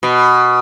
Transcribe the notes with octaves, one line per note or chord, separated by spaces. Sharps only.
B2